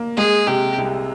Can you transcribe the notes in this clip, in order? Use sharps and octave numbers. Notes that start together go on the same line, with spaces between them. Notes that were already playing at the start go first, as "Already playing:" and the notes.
Already playing: A#3
G#3 G#4
C3 G4
C2